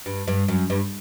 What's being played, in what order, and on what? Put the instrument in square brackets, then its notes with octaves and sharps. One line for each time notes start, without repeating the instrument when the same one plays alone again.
[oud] G2
G2
F#2
G2